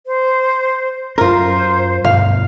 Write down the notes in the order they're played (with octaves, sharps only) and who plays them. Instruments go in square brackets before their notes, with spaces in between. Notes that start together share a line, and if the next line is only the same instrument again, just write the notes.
[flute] C5
[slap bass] F#2 C#4 [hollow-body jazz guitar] F4 A#4 [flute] C5
[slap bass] G2 B2 [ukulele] F5